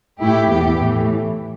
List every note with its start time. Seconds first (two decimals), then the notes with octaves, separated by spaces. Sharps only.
0.19 A2 A3 E4 G4
0.48 E2 E3 B3 G4
0.78 A2 E3 A3